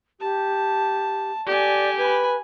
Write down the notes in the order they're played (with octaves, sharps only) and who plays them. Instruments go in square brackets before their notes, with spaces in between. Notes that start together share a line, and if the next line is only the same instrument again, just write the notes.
[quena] G4 [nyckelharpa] A5
[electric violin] G4 [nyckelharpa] A4 G#5 [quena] D5
[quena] B4 [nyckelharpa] G#5 B5